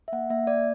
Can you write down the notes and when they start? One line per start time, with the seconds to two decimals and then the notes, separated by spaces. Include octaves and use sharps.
0.08 E5
0.12 A#3 F#5
0.30 A#3 E5
0.47 A#3 D5